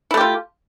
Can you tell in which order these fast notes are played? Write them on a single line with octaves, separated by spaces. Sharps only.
E4 A3 G4 F4